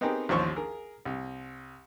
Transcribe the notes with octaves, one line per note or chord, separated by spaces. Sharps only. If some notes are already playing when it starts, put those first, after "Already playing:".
B3 C4 D#4 G4 G#4 A#4
A1 D#2 F3 C5 C#5 C#6
G#4 A#4
C2